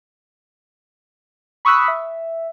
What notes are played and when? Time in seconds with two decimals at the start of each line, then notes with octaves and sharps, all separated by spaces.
1.65 B5 C#6 D#6 E6 F#6 B6
1.88 E5